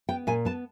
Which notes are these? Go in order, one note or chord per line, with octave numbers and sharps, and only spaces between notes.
B3 G5
A#2 G#5
B3 A5